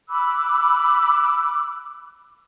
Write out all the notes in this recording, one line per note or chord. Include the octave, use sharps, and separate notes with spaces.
B5 D6 E6 F#6